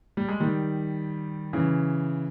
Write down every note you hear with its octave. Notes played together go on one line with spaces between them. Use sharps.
G3
G#3
D#3 G3
C#3 E3